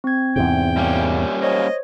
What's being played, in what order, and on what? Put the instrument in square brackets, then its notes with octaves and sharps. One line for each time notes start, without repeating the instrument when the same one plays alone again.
[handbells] C4 G#6
[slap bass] E2 G#2 C3 [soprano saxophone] G5
[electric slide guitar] G3 A#3 C#4
[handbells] C5 C#5 [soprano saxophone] D#5